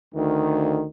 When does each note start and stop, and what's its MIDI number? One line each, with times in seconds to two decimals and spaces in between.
0.15 0.85 38
0.15 0.85 51